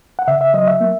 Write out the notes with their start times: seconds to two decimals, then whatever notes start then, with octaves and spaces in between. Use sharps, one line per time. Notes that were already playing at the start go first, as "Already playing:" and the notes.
0.19 F#5
0.28 C#3 E5
0.41 E5
0.54 F#3 D#5
0.68 E5
0.81 A#3